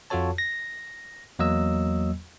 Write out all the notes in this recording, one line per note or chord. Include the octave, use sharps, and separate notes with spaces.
F2 F4 F#4 A4 C#5 A5
A#6
E2 F#3 A#3 D#5 E6